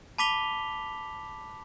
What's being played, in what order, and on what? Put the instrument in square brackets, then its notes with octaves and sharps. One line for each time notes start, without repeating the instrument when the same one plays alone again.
[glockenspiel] A5 B5 D6 B6 F7 G7